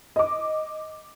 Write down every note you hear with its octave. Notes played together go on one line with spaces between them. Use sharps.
D#5 D6